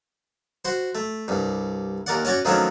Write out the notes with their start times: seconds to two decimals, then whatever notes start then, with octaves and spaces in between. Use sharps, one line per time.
0.65 F#4 C5
0.95 A3
1.28 C2 G2
2.06 D#2 A#4 D5 F#5
2.25 C#4 F#4 C#5 D5
2.45 D#3 F3 F#3 A3 C#4 D4